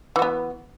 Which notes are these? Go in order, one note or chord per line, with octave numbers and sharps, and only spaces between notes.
E3 B3 F#4